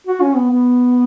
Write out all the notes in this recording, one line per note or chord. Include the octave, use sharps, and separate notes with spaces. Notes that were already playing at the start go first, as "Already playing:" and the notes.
F#4
C#4
B3
B3